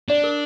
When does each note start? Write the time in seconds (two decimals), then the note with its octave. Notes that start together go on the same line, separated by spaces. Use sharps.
0.09 D4 D5
0.24 A#4